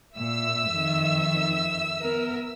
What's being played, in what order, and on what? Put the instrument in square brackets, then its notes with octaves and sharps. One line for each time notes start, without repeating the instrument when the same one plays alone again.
[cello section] A#2 [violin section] E5 E6
[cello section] F2 D#3
B3 A#4